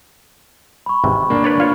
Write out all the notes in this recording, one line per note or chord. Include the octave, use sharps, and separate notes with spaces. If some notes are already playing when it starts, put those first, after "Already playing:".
B5 C#6
G#1 C3 E3
A#3 D4
B4 C#5 D5
F4 C#5